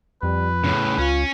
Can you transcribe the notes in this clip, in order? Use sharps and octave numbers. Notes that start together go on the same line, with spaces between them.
F2 G3 B4
A2 C#3 C#4
C#2 C#4 F4